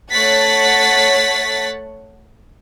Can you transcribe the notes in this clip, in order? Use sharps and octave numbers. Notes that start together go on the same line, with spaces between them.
A3 C#5 F#5 A6 B6